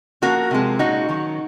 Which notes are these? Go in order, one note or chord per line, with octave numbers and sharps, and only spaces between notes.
F3 A#3 C#4 F#4 A#4
C3 F3 G#3 C4
A#2 G#3 C#4 D#4 F#4
D#3 F#3 C#4